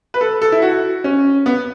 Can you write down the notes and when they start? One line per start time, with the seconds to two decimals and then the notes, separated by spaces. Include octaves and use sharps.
0.14 B4
0.21 A4
0.42 A4
0.52 E4
0.62 F#4
1.04 C#4
1.46 B3